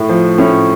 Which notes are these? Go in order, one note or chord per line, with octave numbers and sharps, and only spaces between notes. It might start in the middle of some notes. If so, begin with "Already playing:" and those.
Already playing: A2
F3
A2 C#4